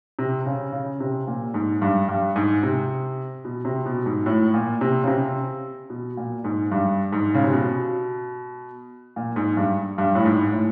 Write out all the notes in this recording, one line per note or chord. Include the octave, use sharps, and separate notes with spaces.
C3
C#3
C#3
C3
A#2
G#2
G2
G2
G#2
C3
B2
C3
B2
G#2
A2
A#2
C3
C#3
C3
B2
A#2
G#2
G2
G#2
C#3
C3
B2
A#2
G#2
G2
G2
A2
G#2
A2